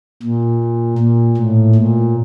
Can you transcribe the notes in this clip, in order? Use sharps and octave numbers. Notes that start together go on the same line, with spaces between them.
A#2
A#2
A2
A#2